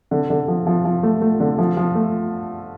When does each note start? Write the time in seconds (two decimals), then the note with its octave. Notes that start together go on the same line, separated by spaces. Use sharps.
0.11 D3
0.30 D3
0.48 F3
0.67 F3
0.85 F3
1.03 A3
1.22 A3
1.40 D3
1.59 F3
1.77 F3
1.95 A3